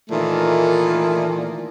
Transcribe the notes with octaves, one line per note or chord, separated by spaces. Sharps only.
A#2 D#3 E3 A3